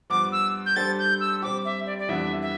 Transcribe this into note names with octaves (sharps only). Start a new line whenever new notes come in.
G2 F3 B3 D6
E6
G6
G3 D4 A4 C5 A6
G6
E6
G3 C4 G4 D6
E5
D5
D5
F2 E3 G3 B3 D4 E5
E5